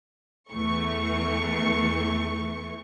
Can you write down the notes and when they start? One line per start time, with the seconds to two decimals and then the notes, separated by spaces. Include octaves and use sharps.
0.50 E2 E3 A3 C#6